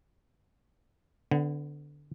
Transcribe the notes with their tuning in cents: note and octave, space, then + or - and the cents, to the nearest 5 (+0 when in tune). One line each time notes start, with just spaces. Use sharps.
D3 +0 B3 +30